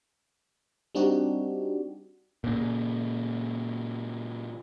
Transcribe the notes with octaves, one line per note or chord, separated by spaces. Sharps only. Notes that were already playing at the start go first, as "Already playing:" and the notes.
G3 C4 D4 D#4 F#4 G4
A#2 C#3